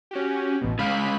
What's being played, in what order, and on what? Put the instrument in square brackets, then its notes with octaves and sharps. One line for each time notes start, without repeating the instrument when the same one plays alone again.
[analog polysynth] C#4 F#4 G4
A1 B2
[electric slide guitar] C#3 G#3 F5 [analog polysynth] B5